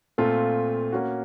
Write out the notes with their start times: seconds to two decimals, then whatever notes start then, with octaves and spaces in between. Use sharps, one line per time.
0.18 A#2 A3 C4 F4 A4
0.92 A#3 C#4 F#4